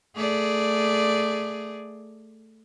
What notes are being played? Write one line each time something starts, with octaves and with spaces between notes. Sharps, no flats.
A3 G#4 D5